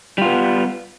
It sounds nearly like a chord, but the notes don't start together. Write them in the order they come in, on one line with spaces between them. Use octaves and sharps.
G3 F4 B3